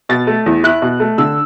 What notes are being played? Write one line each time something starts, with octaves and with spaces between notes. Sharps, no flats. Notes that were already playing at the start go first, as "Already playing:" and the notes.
B2 A6
A3
E2
E4 F#6
B2
A3
D3 E6